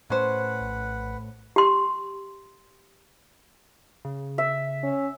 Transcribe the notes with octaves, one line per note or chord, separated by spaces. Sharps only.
A2 C#4 B4 C5 F#5
A#1
G4 C6
C#3
E5
C#4